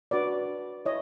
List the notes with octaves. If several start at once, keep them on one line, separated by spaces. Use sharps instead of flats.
D4 F#4 B4 D5
E4 C#5 D#5